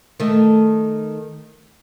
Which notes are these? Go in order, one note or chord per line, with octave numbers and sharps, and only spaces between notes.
D#3 A3